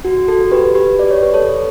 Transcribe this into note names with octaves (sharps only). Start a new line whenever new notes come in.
F#4
F#4 A4
G4 B4
G4 B4
D5
C#5
B4
A4 C#5